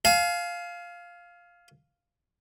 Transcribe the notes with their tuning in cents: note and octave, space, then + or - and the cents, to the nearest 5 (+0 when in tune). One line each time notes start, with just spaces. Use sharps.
F5 +0 G#5 +40